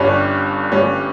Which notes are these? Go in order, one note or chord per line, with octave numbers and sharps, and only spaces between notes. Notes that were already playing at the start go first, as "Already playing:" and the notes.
Already playing: G1 G2 G3 C#4
G1 G2 G3 C#4